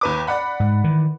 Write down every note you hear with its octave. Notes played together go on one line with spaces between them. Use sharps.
D#2 B4 D6
D5 F#5 B5
G#2
D#3 E3